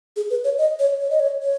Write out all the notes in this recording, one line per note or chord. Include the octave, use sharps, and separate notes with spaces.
G#4
B4
C#5
D#5
C#5
C#5
D#5
C#5
C#5